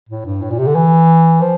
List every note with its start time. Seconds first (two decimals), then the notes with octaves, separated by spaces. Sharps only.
0.09 A2
0.26 G2
0.42 A2
0.50 A#2
0.58 C3
0.67 D3
0.75 E3
1.41 F3